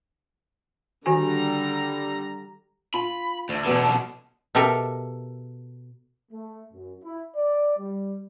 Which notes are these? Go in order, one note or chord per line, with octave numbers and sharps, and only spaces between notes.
D3 D#3 G3 F#4 G#5 A#5
F4 B5
D2
E2 B2 D3 F#3 B3
B2 G4 A4 A#4 E5
A3
F#2
E4
D5
G3